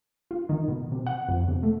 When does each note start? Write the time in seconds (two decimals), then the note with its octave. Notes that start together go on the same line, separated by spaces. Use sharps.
0.31 F4
0.49 D#3
0.68 B2
0.92 C3
1.07 F#5
1.29 F2
1.48 C3
1.63 A3